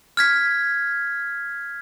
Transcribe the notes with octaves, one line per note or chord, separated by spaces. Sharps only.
F6 G#6 B6